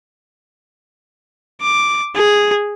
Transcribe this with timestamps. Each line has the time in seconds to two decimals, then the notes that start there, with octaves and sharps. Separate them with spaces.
1.62 D6
2.16 G#4